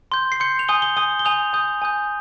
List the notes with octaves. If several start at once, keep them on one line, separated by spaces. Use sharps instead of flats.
C6 G6
C7
C6 G6 C#7
F7
G#5 D#6 G6 G7
G7
G#5 D#6 G6 G7
G7
G#5 D#6 G6 F7
G#5 D#6 G6
G#5 D#6 G6